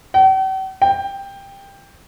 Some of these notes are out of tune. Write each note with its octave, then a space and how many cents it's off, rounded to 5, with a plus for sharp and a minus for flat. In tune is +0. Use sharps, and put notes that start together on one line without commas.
G5 -45
G5 +15